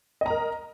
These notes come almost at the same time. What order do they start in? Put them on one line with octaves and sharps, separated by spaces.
D#5 A#5 A#4